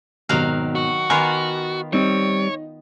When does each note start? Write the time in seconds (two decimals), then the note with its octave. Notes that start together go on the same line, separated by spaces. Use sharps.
0.29 G#1 B2 D#3 F#3 F5
0.75 F#4
1.10 D#3 B3 F4 G#5 A#5 C6
1.93 G3 C4 D#4 C#5 D#5